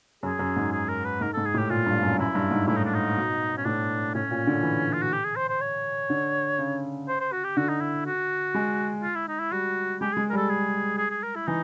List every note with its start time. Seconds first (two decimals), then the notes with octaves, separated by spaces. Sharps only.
0.23 F#2 G#4
0.39 F#2
0.56 G#2
0.72 G#4
0.89 A#4
1.05 B4
1.21 G#2 A#4
1.33 G#2 A4
1.46 G#4
1.54 A2
1.58 G4
1.70 A#2 F4
1.86 G2
2.03 F#2
2.19 F#2 E4
2.35 G2
2.51 G#2
2.67 A2 E4
2.77 D#4
2.85 D4
2.94 D#4
3.16 B2
3.57 C#4
3.65 A2 D4
4.14 A2 C#4
4.31 A#2
4.47 D3
4.63 E3
4.93 F4
5.02 F#4
5.13 G4
5.24 G#4
5.36 C5
5.49 C5
5.61 C#5
6.10 D3
6.58 C#3
7.08 C5
7.20 C5
7.32 F#4
7.44 G4
7.56 D3 F#4
7.69 D#4
7.81 E4
8.06 F#4
8.55 G#3
9.02 F4
9.15 E4
9.28 D#4
9.40 E4
9.52 G3 F#4
10.01 G#3 G4
10.13 G#3 G#4
10.30 A#4
10.33 G3 A4
10.49 G#4
10.98 G#4
11.10 G#4
11.23 A#4
11.35 E4
11.47 E3 D#4